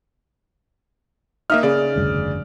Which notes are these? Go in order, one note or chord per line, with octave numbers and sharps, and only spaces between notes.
A#3 D#4 E5 D#6 F6
C#3 D5
F1 D2 G2